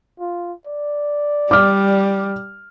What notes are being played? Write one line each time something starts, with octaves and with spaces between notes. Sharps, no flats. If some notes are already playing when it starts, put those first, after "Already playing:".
F4
D5
G3 D6 F6